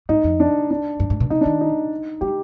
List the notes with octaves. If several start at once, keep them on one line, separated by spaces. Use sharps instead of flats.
G#2 D#4
F2
D4
D4
G2
G#2
B2
C3 D#4
D#3 D4
D#4
G3 G4